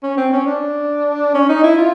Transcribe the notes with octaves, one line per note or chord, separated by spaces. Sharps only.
C#4
C4
C#4
D4
C#4
D#4
E4
F4